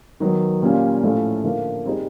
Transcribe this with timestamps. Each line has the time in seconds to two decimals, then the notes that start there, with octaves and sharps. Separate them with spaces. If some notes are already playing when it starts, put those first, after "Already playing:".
0.20 D#3 F#3 B3
0.62 A#2 G3 A#3 C#4 F4
1.03 A2 F3 A3 C#4 F4
1.43 D3 F3 A#3
1.84 G3 C4 D#4 G#4